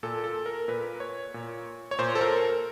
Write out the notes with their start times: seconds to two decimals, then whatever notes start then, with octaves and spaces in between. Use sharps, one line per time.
0.03 A#2 A4
0.24 A4
0.46 A#4
0.68 A#2 B4
1.00 C#5
1.34 A#2
1.91 C#5
1.98 A#2 C5
2.15 A4
2.21 A#4